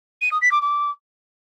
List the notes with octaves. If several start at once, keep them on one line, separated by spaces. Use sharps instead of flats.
D#7
D#6
B6
D6
D6